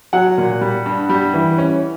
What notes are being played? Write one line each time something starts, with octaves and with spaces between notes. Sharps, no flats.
F#3 F#5
A#2
G3
G2
G3
E3
C#4